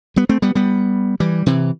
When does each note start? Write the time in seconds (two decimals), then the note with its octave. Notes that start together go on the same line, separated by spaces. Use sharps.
0.16 G3 B3
0.29 A3 C4
0.42 G3 B3
0.55 G3 B3
1.20 E3 G3
1.46 C3 E3